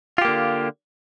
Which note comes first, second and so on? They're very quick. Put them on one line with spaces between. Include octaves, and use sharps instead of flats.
F4 G4 A#3 D3